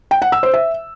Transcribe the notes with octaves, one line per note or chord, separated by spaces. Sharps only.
G5
F#5
E6
C5
E5